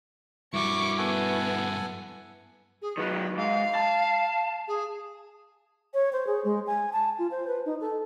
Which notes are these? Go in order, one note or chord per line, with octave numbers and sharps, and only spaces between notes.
G2 E4 F#4 C#6 D6
B3 A4 F#5 G#5
G#4
D#3 F#3 B4
G#2 F5
A5
G#4
C#5
C5
G#4
G#3
G#5
A5
F4
C5
B4
D#4
A4